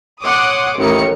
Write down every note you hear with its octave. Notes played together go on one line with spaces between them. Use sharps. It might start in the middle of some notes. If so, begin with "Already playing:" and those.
C#5 F#5 C6 D6 D#6
A1 D#3 A#4 C#7